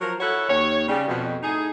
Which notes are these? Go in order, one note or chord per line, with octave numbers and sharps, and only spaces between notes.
F3 F#3 A#4
E4 F#4 A4 C#5 F#5
D#2 C#5
C#3 G3
F2 B2
A2 D#4 G#4